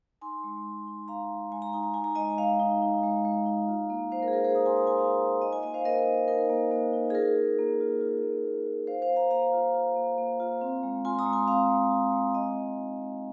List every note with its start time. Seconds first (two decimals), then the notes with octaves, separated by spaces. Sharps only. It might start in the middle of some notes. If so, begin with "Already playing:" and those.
0.21 D#4 G#5 C6
0.44 G#3
0.66 G#3
0.87 D#4
1.08 D#4 F5 A#5
1.30 G#3
1.52 G#3 G#5
1.62 A#5
1.73 D#4 G#5
1.83 A#5
1.94 D#4 G#5
2.04 A#5
2.15 G#3 D#5 G#5
2.38 G#3 F5 A#5
2.60 D#4
2.82 D#4
3.03 G#3
3.25 G#3
3.46 D#4
3.68 F4
3.90 A#3
4.12 A#3 C5 F5
4.22 A#4
4.28 G#4
4.33 F4 A#4
4.44 G#4 C5
4.55 F4 A#5 D#6
4.66 G#5 C6
4.76 A#3 A#5 D#6
4.87 G#5 C6
4.98 A#3 F5 A#5
5.20 F4
5.41 D#4 D#5 G#5
5.53 D#5 G#5
5.63 A#3 D#5 G#5
5.74 C5 F5
5.84 A#3 A#4 D#5
6.06 D#4
6.28 D#4 A#4
6.49 A#3
6.71 A#3
6.93 D#4
7.10 G#4
7.14 F4 A#4
7.36 A#3
7.59 A#3
7.80 F4
8.01 F4
8.23 A#3
8.44 A#3
8.66 F4
8.87 F4 C5 F5
9.02 C5 F5
9.09 A#3
9.16 F5 A#5
9.31 A#3 F5 A#5
9.53 F4
9.74 F4
9.96 A#3
10.18 A#3
10.40 F4
10.61 C4
10.83 G#3
11.05 F4 G#5 C6
11.19 A#5 D#6
11.26 G#3
11.33 G#5 C6
11.47 C4 F5 A#5
11.69 G#3
11.91 F4
12.13 G#3
12.34 C4 D#5 G#5
12.56 G#3
12.77 D#4
12.99 G#3